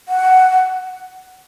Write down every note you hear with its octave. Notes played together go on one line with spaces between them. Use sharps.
F#5